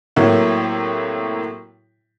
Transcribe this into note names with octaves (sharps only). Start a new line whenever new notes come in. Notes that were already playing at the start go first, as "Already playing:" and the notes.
A2 C3 F#3 A#3 E4